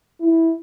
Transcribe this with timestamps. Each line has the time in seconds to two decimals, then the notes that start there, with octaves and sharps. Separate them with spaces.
0.20 E4